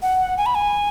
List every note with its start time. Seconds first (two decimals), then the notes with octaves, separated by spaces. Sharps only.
0.02 F#5
0.38 G#5
0.46 B5
0.55 G#5